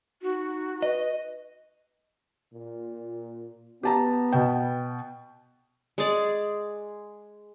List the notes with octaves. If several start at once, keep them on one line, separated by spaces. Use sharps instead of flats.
D#4 F#4
B4 D#5
A#2
B3 G4 A5 A#5
B2 G5
G#3 G#4 D5